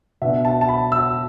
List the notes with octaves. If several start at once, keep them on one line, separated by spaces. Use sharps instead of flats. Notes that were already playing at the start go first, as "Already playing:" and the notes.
B2 B3 D4 E5
A5
A5
B5
E6